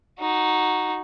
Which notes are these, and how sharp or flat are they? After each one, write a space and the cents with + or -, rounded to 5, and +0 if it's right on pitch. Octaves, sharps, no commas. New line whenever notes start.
D#4 +0 F#4 +0